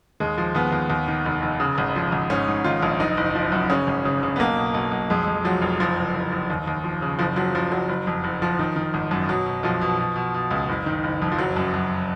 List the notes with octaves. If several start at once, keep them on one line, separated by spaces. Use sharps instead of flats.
D#2 G#3
F3
D#2 B3
D#2
D#2
D#3
F1
F1
C#3
G#1
F3
G#1
G#2 C#4
G#2
D#3 F4
A#1
F#1 D#4
F#1
F3
F#2
C#3 C#4
G#1
C#3
C#3
B3
B1 A#3
B2
B1
B1
F2 G#3
F2
F3 F#3
F1
F#1 F3
F#1
F#1
F#1
D#2
D#2
F3
C#3
F#1 F3
F3 F#3
F#1 F3
F#1 F#3
F#1
F2
F#1
F3
D#3
D#3
G#1
F#2
B2 F#3
B2
B1 F3
B2
B2
B2
B2
C#2
F#1
D#3
F#1
F2
F3
F#1 F#3
F#2
F#2